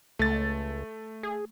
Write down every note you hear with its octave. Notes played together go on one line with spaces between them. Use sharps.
C#2 A3 A6
G#4